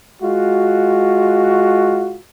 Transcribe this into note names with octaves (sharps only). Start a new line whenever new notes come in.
G#3 F4 F#4